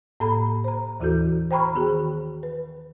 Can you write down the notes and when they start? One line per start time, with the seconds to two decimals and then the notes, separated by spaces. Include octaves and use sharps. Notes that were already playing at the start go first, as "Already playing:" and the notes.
0.20 A2 A#3 A4 A#5 B5
0.64 C5 A#5
1.00 D#2 E3 E4 F#4 A4 G6
1.51 C5 G5 A#5 B5 C#6 F6
1.74 D#3 B3 F#4 G#4
2.43 B4